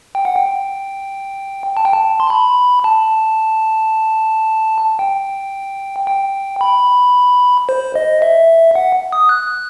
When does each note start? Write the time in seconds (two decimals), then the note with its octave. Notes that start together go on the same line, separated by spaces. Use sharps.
0.15 G5
0.25 F#5
0.36 G5
1.77 A5
1.85 G5
1.93 A5
2.20 C6
2.30 B5
2.84 A5
4.99 G5
6.07 G5
6.61 B5
7.69 C5
7.96 D#5
8.22 E5
8.75 F#5
9.12 D#6
9.29 F#6